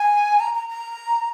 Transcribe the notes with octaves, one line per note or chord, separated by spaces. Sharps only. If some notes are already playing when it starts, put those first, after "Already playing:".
Already playing: G#5
A#5
A#5
A#5